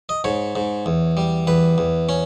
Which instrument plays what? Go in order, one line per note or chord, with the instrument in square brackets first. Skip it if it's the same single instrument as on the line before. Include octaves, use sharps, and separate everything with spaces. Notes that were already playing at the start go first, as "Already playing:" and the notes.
[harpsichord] D#5
G#2 C#5
G#2
E2
G3
E2 B4
E2
C#4